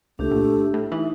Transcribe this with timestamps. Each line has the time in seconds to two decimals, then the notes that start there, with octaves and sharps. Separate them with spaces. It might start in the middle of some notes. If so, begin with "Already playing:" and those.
0.19 C#2 A3 D4 G4
0.31 A#1
0.74 A2
0.92 E3 D#4 E5